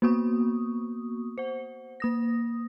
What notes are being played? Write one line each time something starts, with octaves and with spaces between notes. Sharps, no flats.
A#3 B3 F#4 C#6 D#6
C5 F#5
A#3 D#6 A#6